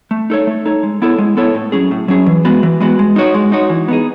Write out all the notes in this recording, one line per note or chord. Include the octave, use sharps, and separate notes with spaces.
A3
D#4 A4 C#5
A3
D#4 A4 C#5
G#3
B3 E4 A4 C#5
G#3
B3 E4 A4 C#5
A2
F#3 C#4 G#4
A2
F#3 C#4 G#4
E3
G#3 B3 F#4
E3
G#3 B3 F#4
G#3
D#4 F#4 C#5
G#3
D#4 F#4 C#5
E3
B3 D#4 G#4